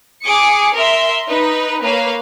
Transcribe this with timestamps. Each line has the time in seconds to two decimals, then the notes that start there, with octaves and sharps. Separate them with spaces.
0.24 G#4 D6 D#6 C#7
0.76 A#4 E5 C6
1.28 D#4 B4
1.84 A#3 B4 C#5 F5